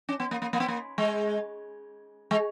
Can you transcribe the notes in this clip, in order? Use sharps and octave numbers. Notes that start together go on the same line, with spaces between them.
C#4
B3
A#3
A#3
A#3
B3
A#3
G#3
G#3